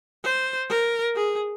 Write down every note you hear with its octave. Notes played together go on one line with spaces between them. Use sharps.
C5
A#4
G#4